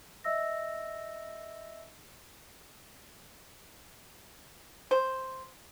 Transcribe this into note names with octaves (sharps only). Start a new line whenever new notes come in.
D#5 E5 E6 A#6
C5